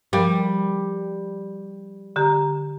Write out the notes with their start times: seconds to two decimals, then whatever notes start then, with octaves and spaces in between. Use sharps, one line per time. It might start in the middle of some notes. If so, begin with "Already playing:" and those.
0.13 F3 G3 A#4
2.16 D3 G4 A#5